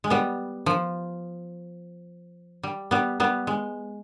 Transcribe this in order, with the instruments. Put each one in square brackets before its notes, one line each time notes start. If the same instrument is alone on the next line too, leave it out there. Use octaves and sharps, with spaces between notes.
[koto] G#3
G3 B3
F3
G3
G3 B3
G3 B3
G#3